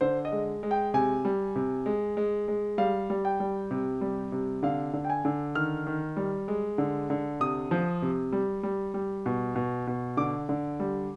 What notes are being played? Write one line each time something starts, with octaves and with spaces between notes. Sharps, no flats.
D3 C5
D#5
G#3
G#3
G5
C3 G#5
G3
C3
G#3
G#3
G#3
G3 F5
G3
G5
G3
C3
G3
C3
D3 F5
D3
G5
G#5
D3
D#3 F6
D#3
G3
G#3
D3
D3
C3 D#6
F3
C3
G3
G3
G3
B2
B2
B2
D3 D6
D3
G3